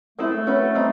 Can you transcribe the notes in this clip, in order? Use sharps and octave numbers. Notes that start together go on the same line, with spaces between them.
G#3 A3 C4 E4
C#4 F#4 B4
G3 C4 D#4